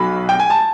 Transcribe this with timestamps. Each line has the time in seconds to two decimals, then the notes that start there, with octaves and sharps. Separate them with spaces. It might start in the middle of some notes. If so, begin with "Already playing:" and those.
Already playing: B1 B2 F#3 B5
0.29 G5
0.40 G#5
0.50 A5